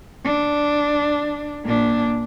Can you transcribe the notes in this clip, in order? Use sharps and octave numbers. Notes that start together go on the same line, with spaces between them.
D4
A#2 D4